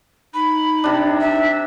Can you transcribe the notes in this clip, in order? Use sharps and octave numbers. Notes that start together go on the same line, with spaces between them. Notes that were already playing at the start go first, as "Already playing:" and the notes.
D#4 B5
C3 D4
E5